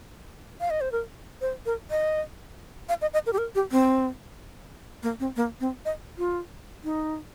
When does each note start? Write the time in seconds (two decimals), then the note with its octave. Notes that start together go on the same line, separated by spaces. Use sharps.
0.60 F5
0.70 D#5
0.81 C5
0.92 A#4
1.41 C5
1.66 A#4
1.91 D#5
2.89 F5
3.02 D#5
3.14 D#5
3.26 A#4
3.33 G4
3.38 A#4
3.55 G4
3.72 C4
5.03 A#3
5.20 C4
5.36 A#3
5.60 C4
5.85 D#5
6.18 F4
6.84 D#4